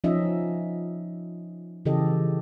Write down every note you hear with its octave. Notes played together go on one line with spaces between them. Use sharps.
F3 C#4 D#4 D#5 E5
C#3 E3 G4 A4 D#5